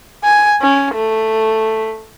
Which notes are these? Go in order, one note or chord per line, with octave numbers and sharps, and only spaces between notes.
G#5
C#4
A3